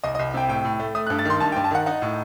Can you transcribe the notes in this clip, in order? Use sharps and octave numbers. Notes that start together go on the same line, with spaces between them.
C2 D#5
D#5
C2
C3 G5
A2 G5
A2
A3
A3 D#6
F#6
G2
A6
D#3 C6
G2 A5
G5
G2
A5
D#3 F#5
D#4 F#5
A2